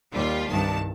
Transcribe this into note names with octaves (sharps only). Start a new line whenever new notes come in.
D#2 G3 F4
C2 G2 D#3 A5